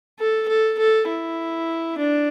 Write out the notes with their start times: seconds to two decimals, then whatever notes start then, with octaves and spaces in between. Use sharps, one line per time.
0.19 A4
0.49 A4
0.79 A4
1.08 E4
1.98 D4